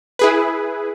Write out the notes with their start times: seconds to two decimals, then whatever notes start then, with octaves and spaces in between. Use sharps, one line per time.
0.19 E4 G#4 B4